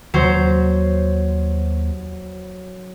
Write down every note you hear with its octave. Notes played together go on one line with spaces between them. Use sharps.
D#2 F#3 C5